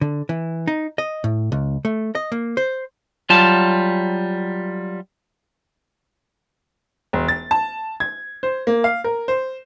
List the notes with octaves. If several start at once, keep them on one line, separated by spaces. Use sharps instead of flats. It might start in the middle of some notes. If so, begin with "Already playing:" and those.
D3
E3
D#4
D#5
A2
C#2
A3
D#5
A#3
C5
F#3 G3 F4 A5
E1
A6
A5
G#6
C5
A#3
F5
A#4
C5